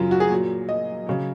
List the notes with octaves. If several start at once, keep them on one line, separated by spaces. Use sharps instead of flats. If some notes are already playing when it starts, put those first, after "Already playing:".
Already playing: F#2 C#3 F#3 F4
F#4
G#4
A#2 F#3
D#5
C#3 F#3